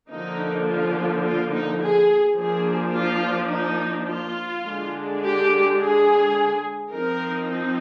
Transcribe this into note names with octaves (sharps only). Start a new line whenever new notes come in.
D3 F3 A#3 D#4
F4
F4
D#4
G#4
F3 A#3 D4 G#4
F4
D#4
F4
D3 G#3 D4
G4
G#4
F3 C4 D#4 A#4